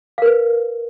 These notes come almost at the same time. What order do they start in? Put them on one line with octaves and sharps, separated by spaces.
F5 A#4 B4